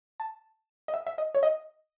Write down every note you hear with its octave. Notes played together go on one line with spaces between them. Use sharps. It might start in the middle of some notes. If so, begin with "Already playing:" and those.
A5
D#5
E5
E5
D#5
C#5
D#5